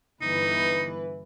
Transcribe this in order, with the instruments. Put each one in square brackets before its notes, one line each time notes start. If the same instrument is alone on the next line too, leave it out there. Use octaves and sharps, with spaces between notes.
[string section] G1 E3 B4 [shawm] D#4